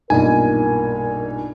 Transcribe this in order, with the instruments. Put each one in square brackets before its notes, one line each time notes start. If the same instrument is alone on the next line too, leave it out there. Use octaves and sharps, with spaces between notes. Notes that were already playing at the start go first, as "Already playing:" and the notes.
[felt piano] B1 G2 A#2 [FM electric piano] D#4 [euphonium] A#4 [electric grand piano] G#5